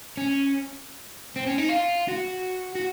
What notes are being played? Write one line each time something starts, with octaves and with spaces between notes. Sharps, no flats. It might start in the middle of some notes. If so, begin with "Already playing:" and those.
C#4
C4
C#4
D#4
F4
F#4
F#4